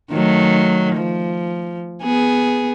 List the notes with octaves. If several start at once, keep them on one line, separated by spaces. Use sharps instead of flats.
D#3 F#3 A3
F3
B3 G#4